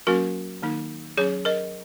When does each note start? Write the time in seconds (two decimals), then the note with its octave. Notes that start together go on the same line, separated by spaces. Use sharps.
0.07 F#3 A#3 C#4 F#4 A#4
0.62 D#3 A#3 D#4
1.18 F#3 C#4 G#4 C#5
1.45 A#4 D#5